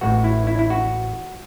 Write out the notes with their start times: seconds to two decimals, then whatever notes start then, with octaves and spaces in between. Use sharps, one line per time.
0.01 A1 A2 E3 F#4
0.24 E4
0.47 E4
0.59 E4
0.70 F#4